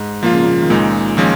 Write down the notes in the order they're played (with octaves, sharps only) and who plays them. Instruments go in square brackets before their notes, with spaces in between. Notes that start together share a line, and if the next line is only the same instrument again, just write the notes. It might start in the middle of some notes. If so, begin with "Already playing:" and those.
Already playing: [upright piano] G#2
[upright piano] A#2 [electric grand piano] F3 A#3 F4
[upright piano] C#3
A#2
D#3
[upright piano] C#2 C#3 [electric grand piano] A#2 G#3 D#4
[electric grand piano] A#2 F3 G#3 C#4 [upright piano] D#3